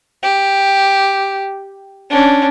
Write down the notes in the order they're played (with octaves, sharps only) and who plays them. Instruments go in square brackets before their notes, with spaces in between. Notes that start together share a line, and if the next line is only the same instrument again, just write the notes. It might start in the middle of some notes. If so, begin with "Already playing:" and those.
[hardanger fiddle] G4
C#4 D4